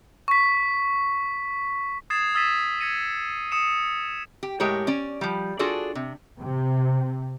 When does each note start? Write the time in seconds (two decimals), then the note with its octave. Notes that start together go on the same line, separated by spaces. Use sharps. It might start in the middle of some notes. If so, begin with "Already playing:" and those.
0.28 C#6 B6
2.10 D#6 G#6 A6 C7 E7
2.35 D#6 E6 A6 B6 D#7 E7
2.80 G#6 A#6 C#7 D#7
3.52 D#6 C#7 E7
4.43 G4
4.60 A2 G#3 G4 A#4 C#5
4.87 C#4 D5
5.21 F3 G3
5.59 D4 F4 F#4 G#4 A4 D5
5.95 C3
6.41 C3